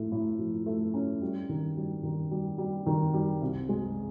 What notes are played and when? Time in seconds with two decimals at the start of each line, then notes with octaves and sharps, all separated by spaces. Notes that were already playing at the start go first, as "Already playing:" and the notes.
Already playing: A2 F3 A3
0.12 A2
0.39 F3
0.66 A3
0.94 C#4
1.22 G3
1.49 D#3
1.77 G3
2.03 D#3
2.31 G3
2.58 G3
2.86 D#3
3.13 G3
3.42 C2
3.69 G#3